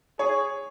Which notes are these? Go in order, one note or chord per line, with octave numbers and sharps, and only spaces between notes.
G#4 C#5